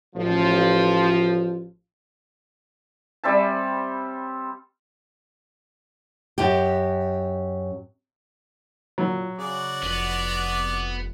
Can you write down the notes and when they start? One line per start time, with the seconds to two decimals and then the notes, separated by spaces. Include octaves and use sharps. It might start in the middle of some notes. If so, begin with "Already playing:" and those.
0.16 A1 F3
3.24 G3 C4 E5 A5
6.38 F#2 G4
8.98 A#2 F#3
9.38 C#3 F#4 D5
9.83 F1 B3